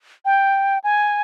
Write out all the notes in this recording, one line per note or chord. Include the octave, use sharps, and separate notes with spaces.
G5
G#5